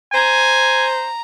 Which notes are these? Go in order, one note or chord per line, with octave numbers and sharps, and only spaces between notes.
C5 G#5 A#5